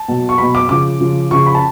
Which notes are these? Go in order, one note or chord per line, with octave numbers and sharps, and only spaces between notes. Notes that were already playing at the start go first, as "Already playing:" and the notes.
Already playing: A5
B2 F#3
C#6
B2 F#3 B5
D6
C#3 F3 D6
C#3 F3
C#3 F3 C#6
B5
A5